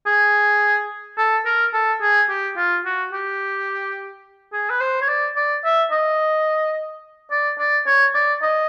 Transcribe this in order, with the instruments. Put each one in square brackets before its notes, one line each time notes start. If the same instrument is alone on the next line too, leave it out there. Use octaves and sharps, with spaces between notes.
[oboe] G#4
A4
A#4
A4
G#4
G4
F4
F#4
G4
G#4
B4
C5
C#5
D5
D5
E5
D#5
D5
D5
C#5
D5
D#5